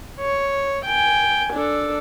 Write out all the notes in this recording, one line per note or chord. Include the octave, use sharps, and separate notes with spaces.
C#5
G5 G#5
D4 A4